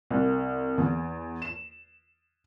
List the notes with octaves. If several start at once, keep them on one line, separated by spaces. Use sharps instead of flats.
C2
E2
E7